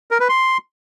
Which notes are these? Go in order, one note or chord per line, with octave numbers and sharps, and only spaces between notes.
A#4
B4
C6